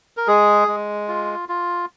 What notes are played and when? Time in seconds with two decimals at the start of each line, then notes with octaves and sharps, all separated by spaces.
0.17 A#4
0.27 G#3 G#4
0.68 G#3
1.08 F4
1.49 F4